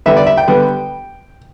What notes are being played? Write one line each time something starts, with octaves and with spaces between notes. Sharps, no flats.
D3 G3 B3 E5
D5
E5
G5
D3 G3 B3